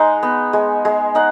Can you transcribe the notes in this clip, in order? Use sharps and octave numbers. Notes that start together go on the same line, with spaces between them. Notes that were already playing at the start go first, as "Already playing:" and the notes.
Already playing: G#3 D#4 F#5
B3
G#3
G#3
D#4 F#5